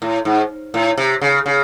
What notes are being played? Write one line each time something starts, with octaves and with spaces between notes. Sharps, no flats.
A2
G#2
A2
C3
C#3
C#3